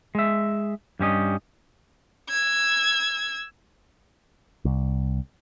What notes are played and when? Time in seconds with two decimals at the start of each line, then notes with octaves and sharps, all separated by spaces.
0.15 G#3 E5
1.00 G2 G3 C#4 D#5
2.29 E6 G#6
4.65 C2